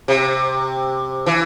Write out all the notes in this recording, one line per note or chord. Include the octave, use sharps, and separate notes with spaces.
C3
E3